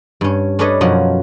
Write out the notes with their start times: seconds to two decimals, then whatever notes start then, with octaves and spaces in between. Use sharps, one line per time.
0.21 G2 C#4
0.59 C#4 D4 A4 B4 C#5 D#5
0.81 F#2 B2 F3 C#4 F#4